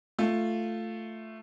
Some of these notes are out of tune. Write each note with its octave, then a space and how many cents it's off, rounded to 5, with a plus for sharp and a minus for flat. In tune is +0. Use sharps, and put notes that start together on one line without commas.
A3 +5 F4 +0